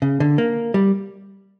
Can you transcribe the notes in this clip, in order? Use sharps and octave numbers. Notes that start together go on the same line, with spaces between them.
C#3
D3
A#3
G3